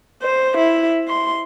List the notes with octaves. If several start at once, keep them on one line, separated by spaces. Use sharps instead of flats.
C5
E4
C6